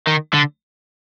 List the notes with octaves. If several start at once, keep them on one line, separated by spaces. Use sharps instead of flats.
D#3
D3